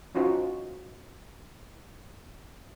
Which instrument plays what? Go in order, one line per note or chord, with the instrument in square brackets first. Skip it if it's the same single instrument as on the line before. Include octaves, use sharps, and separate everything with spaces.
[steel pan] C#4 D#4 F4 F#4 C5